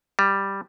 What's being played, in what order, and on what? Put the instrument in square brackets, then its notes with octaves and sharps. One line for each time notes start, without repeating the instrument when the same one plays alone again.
[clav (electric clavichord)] G3